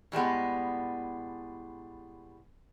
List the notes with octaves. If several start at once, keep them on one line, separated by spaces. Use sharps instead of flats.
A2 G3 G#3 B3